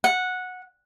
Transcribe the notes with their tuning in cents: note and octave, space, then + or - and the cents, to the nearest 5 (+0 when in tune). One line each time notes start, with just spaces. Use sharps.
F#5 -10